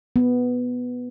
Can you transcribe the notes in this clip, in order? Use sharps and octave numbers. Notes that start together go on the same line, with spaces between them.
B3